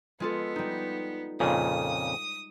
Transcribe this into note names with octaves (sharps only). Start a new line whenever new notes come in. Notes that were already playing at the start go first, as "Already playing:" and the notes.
G#3 B3 F4 A4
G3 D#4
F2 A#2 C#3 D#6